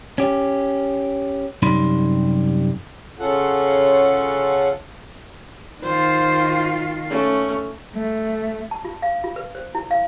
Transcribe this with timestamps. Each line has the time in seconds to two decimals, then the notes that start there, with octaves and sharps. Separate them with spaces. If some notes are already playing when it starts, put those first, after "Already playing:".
0.18 C#4 G4
1.62 F#2 C3 G3 D#4 B5 C6
3.20 C#3 C#4 F4 A4 F#5
5.83 D#3 F4 C5
7.10 A3 C#4
7.95 A3
8.71 A5
8.85 F4
9.02 F5
9.24 F4
9.36 B4
9.55 C5
9.75 E4
9.91 F5